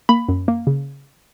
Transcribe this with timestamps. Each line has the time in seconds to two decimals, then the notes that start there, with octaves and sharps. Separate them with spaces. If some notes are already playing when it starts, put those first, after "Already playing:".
0.09 A#3 B5
0.29 F#2
0.48 A#3
0.67 C#3